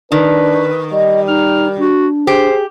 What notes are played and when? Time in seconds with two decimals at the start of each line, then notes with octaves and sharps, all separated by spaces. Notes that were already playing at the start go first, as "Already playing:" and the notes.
0.12 D#3 D4 B4
0.93 G3 D#5
1.28 D#4 F6
1.78 D4 F#4
2.27 G4 G#4 C5